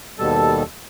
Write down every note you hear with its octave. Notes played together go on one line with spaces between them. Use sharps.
D#2 B2 G3 A4 A5